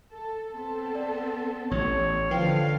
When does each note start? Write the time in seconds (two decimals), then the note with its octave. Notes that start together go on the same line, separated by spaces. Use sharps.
0.11 A4
0.53 B3 C4 A4
0.95 D5
1.71 A1 C#5
2.31 D3 F3 B4 F5 G5